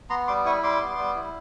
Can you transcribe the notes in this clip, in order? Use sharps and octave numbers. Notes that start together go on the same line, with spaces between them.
B3 A#5 C6
G3 C6 D6
E4 C#6 D#6
G3 C6 D6
B3
G3
E4